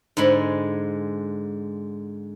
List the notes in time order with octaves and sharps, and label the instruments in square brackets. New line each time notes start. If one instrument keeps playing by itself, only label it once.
[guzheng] G#2 D3 G#3 B5